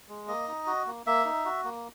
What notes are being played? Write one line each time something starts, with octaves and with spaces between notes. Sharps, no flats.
G#3
A#3 D#5
D#4
F#4
A#3
A#3 E5
D#4
F#4
A#3